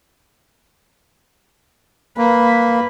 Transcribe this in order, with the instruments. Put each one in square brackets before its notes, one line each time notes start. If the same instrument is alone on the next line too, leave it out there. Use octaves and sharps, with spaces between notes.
[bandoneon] A#3 [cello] B4